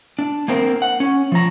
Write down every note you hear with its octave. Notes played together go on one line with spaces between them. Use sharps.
D4
A#3 C4 A#4 C5
F#5
C#4
F3 A#5